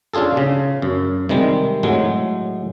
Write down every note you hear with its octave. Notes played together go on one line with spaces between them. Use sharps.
C#4 D4 F4 G#4 A4
C#3
F#2
C3 D#3 G3 G#3
A2 F#3 G#3